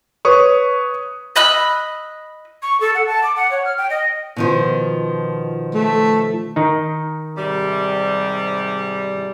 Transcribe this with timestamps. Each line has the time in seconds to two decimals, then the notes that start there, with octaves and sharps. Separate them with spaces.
0.25 B4 C#5 C#6 D#6
1.36 D#5 B5 E6 F#6
2.63 C#6
2.80 A4
2.95 F#5
3.07 A5
3.23 D6
3.36 F#5
3.51 C#5
3.65 F6
3.78 G5
3.90 D#5
4.36 B2 D#3 F3
5.74 A3
6.56 D#3 D#4
7.37 G#2 C3 G3